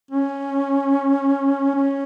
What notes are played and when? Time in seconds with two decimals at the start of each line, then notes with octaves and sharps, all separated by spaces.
0.11 C#4
1.76 C#4